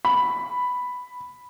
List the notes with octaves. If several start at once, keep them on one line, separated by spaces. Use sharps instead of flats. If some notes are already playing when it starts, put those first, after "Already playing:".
B5